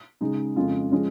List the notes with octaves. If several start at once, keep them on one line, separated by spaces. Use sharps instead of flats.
C#3 G#3 D#4
F2 C#3 G#3 F4
F3 G#3 C#4